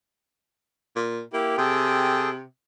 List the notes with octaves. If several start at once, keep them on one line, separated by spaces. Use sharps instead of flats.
A#2
A#3 E4 G4
C3 G#4 A4 G5